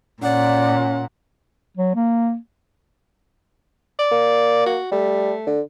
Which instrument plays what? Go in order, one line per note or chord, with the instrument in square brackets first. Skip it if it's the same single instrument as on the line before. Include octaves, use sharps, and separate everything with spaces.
[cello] A#2 [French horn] C#4 [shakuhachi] D5 [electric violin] F#5
[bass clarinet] F#3
A#3
[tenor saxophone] D5
[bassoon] A#3
[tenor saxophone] F#4
[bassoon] G3 [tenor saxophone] A3
[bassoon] D3